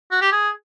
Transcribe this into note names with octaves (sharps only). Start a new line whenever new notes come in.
F#4
G4
G#4